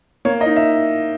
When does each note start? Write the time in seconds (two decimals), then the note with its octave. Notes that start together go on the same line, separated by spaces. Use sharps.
0.25 A#3 C#5
0.41 D#5
0.46 D#4
0.56 E5